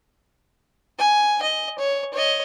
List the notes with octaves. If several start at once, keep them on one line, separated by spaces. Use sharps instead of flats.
G#5
D#5
C#5
C#5 D#5